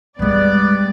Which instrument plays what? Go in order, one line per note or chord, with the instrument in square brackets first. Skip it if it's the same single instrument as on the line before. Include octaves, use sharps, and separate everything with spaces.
[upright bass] G2 G#3 [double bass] G3 [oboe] B3 [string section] D5